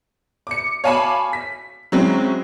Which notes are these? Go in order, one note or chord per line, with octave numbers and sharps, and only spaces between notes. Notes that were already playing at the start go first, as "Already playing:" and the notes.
D6 C#7
C#5 F5 G#5 A5 B5 D6
B6
F#3 G#3 C4 C#4 E4